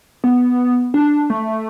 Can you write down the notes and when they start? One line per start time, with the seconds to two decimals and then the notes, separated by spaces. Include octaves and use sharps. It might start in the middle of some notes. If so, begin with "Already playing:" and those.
0.24 B3
0.94 D4
1.30 A3